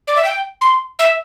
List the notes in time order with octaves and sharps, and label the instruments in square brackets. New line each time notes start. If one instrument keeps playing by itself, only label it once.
[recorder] D5
E5
G5
C6
E5